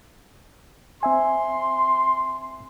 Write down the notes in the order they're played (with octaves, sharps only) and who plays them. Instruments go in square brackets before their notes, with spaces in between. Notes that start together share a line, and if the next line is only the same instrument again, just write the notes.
[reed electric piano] C4 E5 G#5 [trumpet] C6